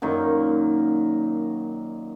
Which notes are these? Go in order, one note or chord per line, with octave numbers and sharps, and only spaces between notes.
F#2 A#2 D#3